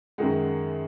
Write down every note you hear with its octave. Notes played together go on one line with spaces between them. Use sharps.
F#2 D#3 G#3 F#5